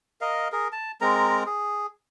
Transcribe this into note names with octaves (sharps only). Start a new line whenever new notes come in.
A#4 D#5 F5
G#4 A#4
A5
G#3 C4 A#4 A#5
G#4